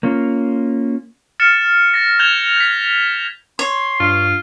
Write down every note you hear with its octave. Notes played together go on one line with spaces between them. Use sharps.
A#3 C#4 F4
F6 A6 C#7 E7
A6 A#6
G6 G#6 E7 F7 G7
G6 B6
C#5 C6
G2 F4